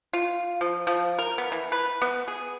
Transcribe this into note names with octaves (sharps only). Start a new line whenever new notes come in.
F4
F3
F3
A#4
B3
E3
B4
B3
G#4